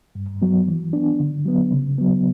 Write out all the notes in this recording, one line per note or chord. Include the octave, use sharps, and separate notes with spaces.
G2
F#3 B3
E3
B3 D4
D3
F#3 B3
C#3
F#3 B3